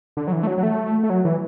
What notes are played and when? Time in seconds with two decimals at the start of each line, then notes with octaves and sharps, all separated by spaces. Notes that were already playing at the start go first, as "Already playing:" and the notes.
0.17 D3
0.28 F#3
0.32 E3
0.43 A3
0.47 F#3
0.58 F#3
0.63 A3
1.03 A3
1.10 F#3
1.25 E3